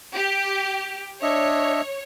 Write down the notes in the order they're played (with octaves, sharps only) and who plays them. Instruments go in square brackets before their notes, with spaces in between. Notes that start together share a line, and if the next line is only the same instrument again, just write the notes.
[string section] G4
[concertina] D4 D#5 E5 [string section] C#5